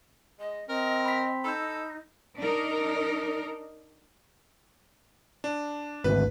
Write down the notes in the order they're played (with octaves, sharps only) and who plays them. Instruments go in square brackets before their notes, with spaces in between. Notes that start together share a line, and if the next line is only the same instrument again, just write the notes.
[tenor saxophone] G#3 [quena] D#5
[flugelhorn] C4 [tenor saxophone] A#4 [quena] D#5
[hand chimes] B5 B6
[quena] D#4 [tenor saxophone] A4 [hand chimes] B5 E6 G6
[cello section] D4 D#4 A#4
[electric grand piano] D4
[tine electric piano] G#1 D2 [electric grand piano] B4